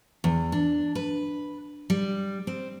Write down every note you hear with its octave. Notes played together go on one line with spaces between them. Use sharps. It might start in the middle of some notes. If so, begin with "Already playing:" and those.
E2
D4
B4
G3
C4